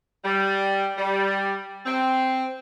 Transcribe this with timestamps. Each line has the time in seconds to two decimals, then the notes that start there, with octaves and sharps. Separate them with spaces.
0.24 G3
0.96 G3
1.86 C4